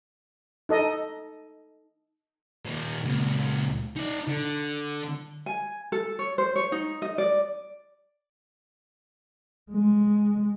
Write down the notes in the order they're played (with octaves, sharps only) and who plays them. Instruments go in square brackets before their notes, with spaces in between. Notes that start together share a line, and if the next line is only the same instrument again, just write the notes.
[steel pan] D#4 A4 D#5
[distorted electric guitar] A#2 D#3
C#2 A#2
D#4 D5
D3
[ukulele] G#5
A4
C#5
C5
C#5
D#4
D#5
D5
[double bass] G#3